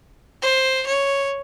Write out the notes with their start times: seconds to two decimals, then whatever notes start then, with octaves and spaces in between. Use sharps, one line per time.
0.42 C5
0.87 C#5